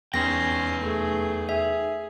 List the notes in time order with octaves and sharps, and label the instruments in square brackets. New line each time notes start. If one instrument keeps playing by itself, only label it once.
[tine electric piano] E2 [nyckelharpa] C#4 C6 [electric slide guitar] D#4 B4 G5 [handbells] A#6
[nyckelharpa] A3 G#4
[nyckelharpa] G#4 [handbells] E5